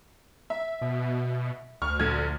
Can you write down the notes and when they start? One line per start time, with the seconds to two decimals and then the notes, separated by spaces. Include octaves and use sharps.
0.50 E5
0.82 B2
1.82 D2 C#6 F6
2.00 A#1 D3 G#6